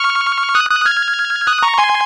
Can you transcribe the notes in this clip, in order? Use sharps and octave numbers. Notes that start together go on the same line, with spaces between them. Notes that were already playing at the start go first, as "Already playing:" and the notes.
Already playing: C#6 F6
D#6 F#6
D#6 F#6
F6 G#6
D#6 F#6
A#5 C#6
G#5 C6